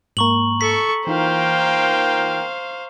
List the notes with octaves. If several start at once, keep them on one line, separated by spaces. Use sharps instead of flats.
G#2 A#3 A#5 C#6 F#7
A4 C#6 B6
E3 A#3 D#4 F4 A#4 C5 F5 G5